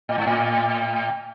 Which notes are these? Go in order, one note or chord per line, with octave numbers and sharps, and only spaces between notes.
A2
G#2
A2